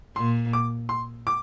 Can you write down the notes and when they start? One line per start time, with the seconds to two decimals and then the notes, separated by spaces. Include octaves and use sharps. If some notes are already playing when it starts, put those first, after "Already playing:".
0.16 A#2 C6
0.53 D6
0.89 C6
1.27 D6